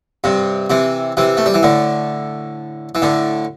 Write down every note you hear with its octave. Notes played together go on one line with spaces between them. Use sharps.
G2 C3
C3 E3
C3 E3
A3
G3
E3
A2 D3
E3
A2 D3